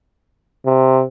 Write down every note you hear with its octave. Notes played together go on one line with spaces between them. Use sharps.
C3